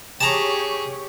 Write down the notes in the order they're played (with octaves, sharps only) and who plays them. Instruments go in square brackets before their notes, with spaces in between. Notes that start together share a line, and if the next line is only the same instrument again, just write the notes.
[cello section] G4 C#5 [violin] G#4 [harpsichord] A5 A#5